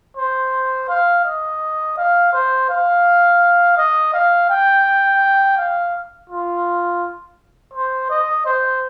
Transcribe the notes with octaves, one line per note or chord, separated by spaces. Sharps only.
C5
F5
D#5
F5
C5
F5
D#5
F5
G5
F5
F4
C5
D#5
C5